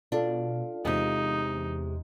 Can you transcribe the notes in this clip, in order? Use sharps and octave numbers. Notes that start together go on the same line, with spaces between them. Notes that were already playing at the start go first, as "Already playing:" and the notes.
B2 D4 F4 A4 F5
E2 C3 G#3 D#4